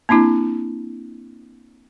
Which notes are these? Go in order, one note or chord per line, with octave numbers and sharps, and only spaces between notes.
A#3 C4 D4 E4